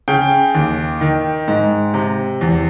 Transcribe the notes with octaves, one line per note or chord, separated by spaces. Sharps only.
C#3 G5
D#2
D#3
G#2
C3
E2